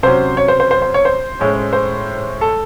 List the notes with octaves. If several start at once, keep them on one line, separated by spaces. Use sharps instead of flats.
C3 F#3 C#4 C5
C#5
C5
C5
C5
C5
C#5
C5
A2 G#3 C#4
C5
A4